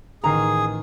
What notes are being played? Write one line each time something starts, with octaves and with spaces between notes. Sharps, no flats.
A1 D#3 G#4 A#5 C7